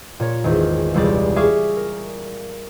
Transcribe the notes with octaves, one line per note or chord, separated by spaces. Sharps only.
A#2 C#5
G#1 E2
E1 C#2 G3 D5
G#4 E5 F5 C#6 D6 F6
A#4